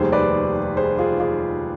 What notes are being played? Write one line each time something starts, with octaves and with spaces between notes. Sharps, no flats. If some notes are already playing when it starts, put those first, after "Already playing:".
Already playing: F1 D#2 D#3 G3 G#4 C5
B4 D5
G#4 C5
F4 G#4
F4 G#4